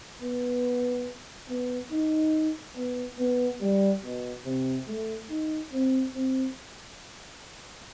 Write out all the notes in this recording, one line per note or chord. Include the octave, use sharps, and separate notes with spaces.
B3
B3
D#4
B3
B3
G3
B2
C3
A3
D#4
C4
C4